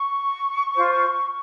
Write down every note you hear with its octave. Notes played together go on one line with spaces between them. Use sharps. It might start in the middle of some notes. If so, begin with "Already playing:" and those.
Already playing: C#6
F4 C5